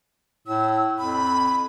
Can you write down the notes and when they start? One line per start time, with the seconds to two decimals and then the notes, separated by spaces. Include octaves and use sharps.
0.47 A2 E6
0.98 F2 B5